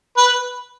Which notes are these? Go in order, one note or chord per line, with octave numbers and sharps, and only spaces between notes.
B4